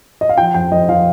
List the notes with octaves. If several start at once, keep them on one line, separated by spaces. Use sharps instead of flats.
D#5
F5
F3 G5
F2 G5
F2 D#5
F3 F5